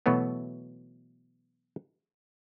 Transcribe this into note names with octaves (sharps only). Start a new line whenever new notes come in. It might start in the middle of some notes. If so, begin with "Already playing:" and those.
B2 E3 F#3 A3 B3